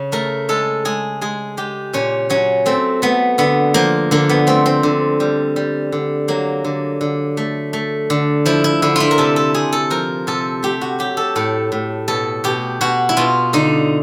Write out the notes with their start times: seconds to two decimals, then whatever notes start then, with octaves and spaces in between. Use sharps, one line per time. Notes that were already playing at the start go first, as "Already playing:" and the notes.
Already playing: C#3
0.12 A3 A#4
0.49 G#3 A4
0.85 G#3 G#4
1.21 G#3 G#4
1.57 G#3 G4
1.93 A#2 C#4
2.30 F#3 C#4
2.66 A3 C4
3.02 A3 B3
3.38 D3 B3
3.74 F3 A#3
4.11 D3 A#3
4.29 B3
4.47 A3 C4
4.66 C4
4.83 D3
5.20 G3
5.56 G3
5.92 D3
6.28 F#3 A#3
6.64 D3
7.01 D3
7.37 A3
7.73 A3
8.10 D3
8.46 F3 E4
8.64 E4
8.82 D3 E4
8.96 E4 F4
9.11 A#4
9.18 C3 A4
9.36 A4
9.55 C3 G#4
9.73 A4
9.90 F3 A#4
10.27 C3 A4
10.63 A3 G4
10.81 F#4
10.99 F#3 G4
11.17 A4
11.36 A2 A4
11.72 A2
12.08 B2 A4
12.44 B2 G4
12.81 B2 F#4
13.09 E4
13.17 B2 F4
13.53 D3 D#4